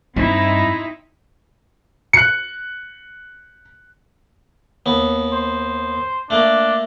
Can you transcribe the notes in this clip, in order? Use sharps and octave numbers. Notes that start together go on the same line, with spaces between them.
G2 C4 D#4 E4
F#6 C#7
D#2 B3
C5
A3 A#3 D4